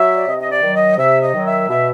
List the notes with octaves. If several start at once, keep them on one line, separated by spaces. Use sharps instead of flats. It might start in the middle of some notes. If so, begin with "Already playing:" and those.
Already playing: F#3 E5
D5
C3 D#5
D#5
D5
D#3 F#3
D#5
C3 E5
D#5
D#3 F#3
E5
B2 E5